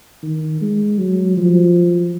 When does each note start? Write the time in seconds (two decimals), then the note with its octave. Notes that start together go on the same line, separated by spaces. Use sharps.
0.23 D#3
0.61 G#3
0.98 F#3
1.37 F3